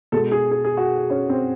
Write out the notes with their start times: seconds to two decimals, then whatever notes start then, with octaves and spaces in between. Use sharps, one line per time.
0.12 B2 G#3 A4
0.32 G#4
0.51 G#4
0.64 G#4
0.77 F#4
1.10 C#4
1.29 C4